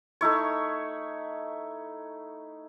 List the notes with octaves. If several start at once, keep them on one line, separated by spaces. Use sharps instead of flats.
A3 D#4 E4 C#5